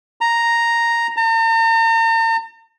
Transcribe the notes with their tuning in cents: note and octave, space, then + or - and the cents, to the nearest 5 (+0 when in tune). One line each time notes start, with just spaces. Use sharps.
A#5 +0
A#5 -45